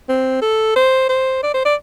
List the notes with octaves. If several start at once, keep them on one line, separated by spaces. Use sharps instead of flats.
C4
A4
C5
C5
D5
C5
D5